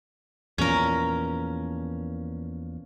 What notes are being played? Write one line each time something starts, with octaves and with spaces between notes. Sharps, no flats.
E2 A#2 F3 C#4 A#4